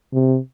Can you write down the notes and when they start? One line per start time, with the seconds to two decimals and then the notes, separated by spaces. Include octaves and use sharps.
0.13 C3